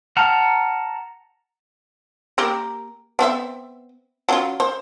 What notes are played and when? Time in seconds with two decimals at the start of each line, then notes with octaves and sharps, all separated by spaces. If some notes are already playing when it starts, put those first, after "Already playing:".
0.17 F#5 A5 A#5 F6
2.38 A#3 G4 A#4
3.19 B3 C4 E5
4.29 F#3 C#4 F4
4.60 C5